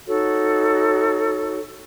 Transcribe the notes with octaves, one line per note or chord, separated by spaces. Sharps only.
D#4 F#4 A4 C#5